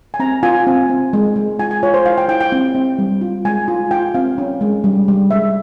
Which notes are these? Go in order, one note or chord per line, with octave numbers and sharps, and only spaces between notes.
G#5
C4 A#5
F4 G#5
C4
C4
G#3
G#3
F4 G#5
G#5
F4 C#5
C5
E4 F5
G5
E4 G5
G5
C4
C4
G3
F4
G#3 G#5
F4
F4 G5
C4 F5
C#4
G#3
G3
G3
G#3 E5